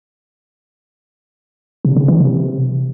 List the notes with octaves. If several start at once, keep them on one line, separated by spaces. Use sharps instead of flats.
C3
C#3
E3
C3